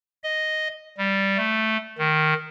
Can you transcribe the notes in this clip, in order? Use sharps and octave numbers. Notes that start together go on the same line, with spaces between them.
D#5
G3
A3
D#3